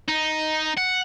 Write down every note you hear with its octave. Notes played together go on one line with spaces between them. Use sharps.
D#4
F#5